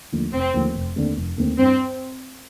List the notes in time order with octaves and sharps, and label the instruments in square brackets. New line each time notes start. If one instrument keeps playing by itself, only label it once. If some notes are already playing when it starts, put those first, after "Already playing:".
[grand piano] D#2 D3 F3 A3
[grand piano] F1 [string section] C4
[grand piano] D#2 D3 F3 A3
F1
D#2 D3 A3 C4
F1
D#2 D3 A3 C4
[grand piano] G2 [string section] C4